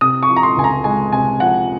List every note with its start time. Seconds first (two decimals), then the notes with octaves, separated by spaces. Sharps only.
0.01 C3 D#6
0.23 C#6
0.30 F3
0.36 A#5
0.43 C6
0.57 C#2 G#5
0.64 A#5
0.84 G#3 G#5
1.12 C3 G#5
1.40 F3 F#5